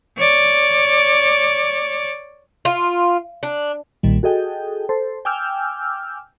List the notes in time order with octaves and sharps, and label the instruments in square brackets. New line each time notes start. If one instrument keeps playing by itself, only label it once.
[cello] C#5 D5
[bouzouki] F4
D4
[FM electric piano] B1 A#2 D#3 G3
F#4 G#4 A4 D#5 G5
A4 C5
G5 G#5 D6 E6 F6 G6